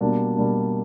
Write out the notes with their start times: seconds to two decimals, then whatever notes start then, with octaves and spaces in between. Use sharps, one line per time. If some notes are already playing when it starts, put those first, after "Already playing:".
0.01 B2 G3 A#3 D4
0.36 B2 G3 A#3 D4